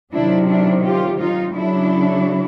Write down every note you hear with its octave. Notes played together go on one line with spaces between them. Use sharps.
C3 D#3 F#3 D4 E4
D4 E4
F4 G4
D#4 F4
C#3 F#3 D4 E4